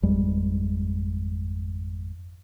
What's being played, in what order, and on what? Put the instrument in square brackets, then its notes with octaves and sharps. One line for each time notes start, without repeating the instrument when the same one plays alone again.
[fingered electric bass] G#1 F2 G3 G#3